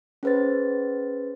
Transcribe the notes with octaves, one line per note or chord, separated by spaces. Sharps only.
C#4 G#4 B4 C5 A6